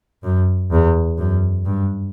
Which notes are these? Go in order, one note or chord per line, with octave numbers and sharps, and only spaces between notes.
F#2
E2
F#2
G2